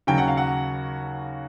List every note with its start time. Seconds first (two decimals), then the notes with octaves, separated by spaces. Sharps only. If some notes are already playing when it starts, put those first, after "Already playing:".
0.07 D#2 C#3 F#3 G5
0.18 F#5
0.28 F5
0.37 F#5